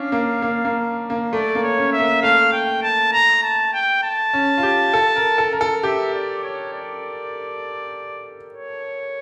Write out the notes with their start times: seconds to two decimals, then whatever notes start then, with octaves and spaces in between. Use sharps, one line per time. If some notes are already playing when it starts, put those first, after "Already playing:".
Already playing: C#4 D4 F5
0.12 A#3
0.42 A#3
0.65 A#3
1.10 A#3
1.32 A3 D5
1.55 A#3
1.63 C#5
1.77 C#4
1.92 E5
2.00 A#3
2.22 A3 F5
2.52 G5
2.83 A5
3.13 A#5
3.43 A5
3.74 G5
4.03 A5
4.33 C#4
4.57 F4
4.63 G4
4.94 A4
5.16 A#4
5.38 A4
5.53 A#4
5.61 A4
5.83 G4 E5
6.14 D5
6.43 C#5
6.74 D5
8.54 C#5